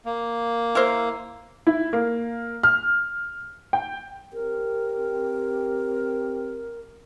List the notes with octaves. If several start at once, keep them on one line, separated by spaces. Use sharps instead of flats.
A#3
E4 A#4 C5
E4
A#3
F6
G5
C4 G4 A#4